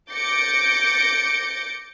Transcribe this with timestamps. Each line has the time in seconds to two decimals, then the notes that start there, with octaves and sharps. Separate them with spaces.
0.11 D6 G6 A6 A#6 C#7 D7